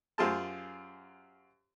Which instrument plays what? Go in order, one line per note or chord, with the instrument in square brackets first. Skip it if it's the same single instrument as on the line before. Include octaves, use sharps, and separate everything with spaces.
[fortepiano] F#2 F4 G4 G#4 C5 A5